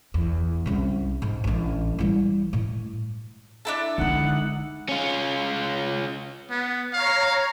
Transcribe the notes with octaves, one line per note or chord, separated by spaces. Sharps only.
E2
C2 C#3
G#2
A1 D4
E3 G3
A2
D4 E4 A4
D3 G#3 D#4 F#5
C#4 F4
B3
C#5 F5 A#5